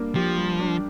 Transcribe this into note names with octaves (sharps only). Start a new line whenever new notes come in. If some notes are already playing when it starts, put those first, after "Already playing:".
Already playing: G3 A#3 D4
F3 G4
G3
D4